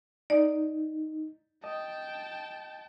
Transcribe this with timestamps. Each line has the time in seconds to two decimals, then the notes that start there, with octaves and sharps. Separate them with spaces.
0.30 D#4 D5
1.64 D#5 G5 A5